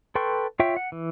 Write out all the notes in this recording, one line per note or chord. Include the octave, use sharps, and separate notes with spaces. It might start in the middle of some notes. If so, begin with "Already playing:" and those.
A4 B4 G5 C6 C#6
F4 C#5 E5 G5
F#5
E3